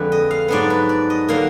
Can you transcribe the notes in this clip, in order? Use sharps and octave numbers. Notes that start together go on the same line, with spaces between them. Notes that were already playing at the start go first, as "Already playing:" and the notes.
Already playing: F2 D3 G#3 B4
D#5
F5
G#2 F#3 B3 D4 D5
B4
D5
D#5
D3 F#3 A#3 F5